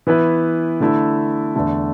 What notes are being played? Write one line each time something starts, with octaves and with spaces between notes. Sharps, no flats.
E3 B3 E4 B4
D3 A3 E4
E2 D3 A3